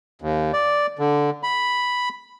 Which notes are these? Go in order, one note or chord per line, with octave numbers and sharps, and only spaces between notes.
D#2
D5
D3
B5